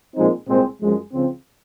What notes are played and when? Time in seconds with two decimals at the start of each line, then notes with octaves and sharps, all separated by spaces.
0.16 A#2 F3 G#3 C4 D#4
0.48 C2 A#2 G#3 C4
0.80 F#2 F3 G#3
1.13 C#2 C#3 F3 C4